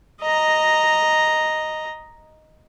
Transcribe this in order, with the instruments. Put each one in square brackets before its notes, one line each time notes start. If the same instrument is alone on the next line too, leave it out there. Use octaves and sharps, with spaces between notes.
[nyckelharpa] D#5 A#5